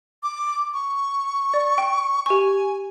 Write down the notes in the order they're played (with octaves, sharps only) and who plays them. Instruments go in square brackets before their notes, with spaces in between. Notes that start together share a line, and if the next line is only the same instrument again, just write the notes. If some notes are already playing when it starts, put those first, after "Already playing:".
[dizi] D6
C#6
[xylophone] D5
G5
[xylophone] G4 C#6 [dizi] G#5